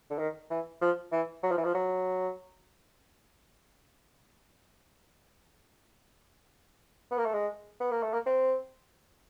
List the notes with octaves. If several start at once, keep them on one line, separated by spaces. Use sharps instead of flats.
D3
D#3
E3
F3
E3
F#3
F3
E3
F3
F#3
B3
A#3
A3
G#3
B3
A#3
A3
A#3
C4